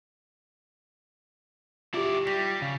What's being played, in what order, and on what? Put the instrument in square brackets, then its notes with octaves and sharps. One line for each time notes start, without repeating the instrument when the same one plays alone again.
[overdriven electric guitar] E4 D5 [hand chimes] F4 G4
[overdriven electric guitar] G3 [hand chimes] A#6 B6
[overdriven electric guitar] C#3